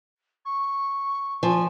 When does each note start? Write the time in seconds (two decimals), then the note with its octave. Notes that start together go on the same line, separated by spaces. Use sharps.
0.45 C#6
1.43 F3 G#5